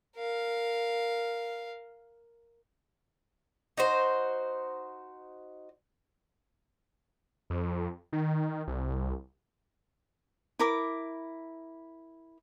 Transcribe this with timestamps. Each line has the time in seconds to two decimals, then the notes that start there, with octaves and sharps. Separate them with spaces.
0.16 A#4 F5
3.77 D#4 F#4 C5
7.50 F2
8.13 D#3
8.67 C2
10.59 E4 A#4 D6